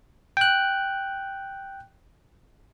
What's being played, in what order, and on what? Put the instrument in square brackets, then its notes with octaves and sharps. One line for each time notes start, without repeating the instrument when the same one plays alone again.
[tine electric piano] G5 F#6